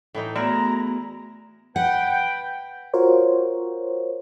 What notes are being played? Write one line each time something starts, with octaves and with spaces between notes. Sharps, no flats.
A2 E3 D#4
A3 B3 E4 F#4 G#4 A#5
B4 F#5 G5
F4 F#4 A#4 C5 C#5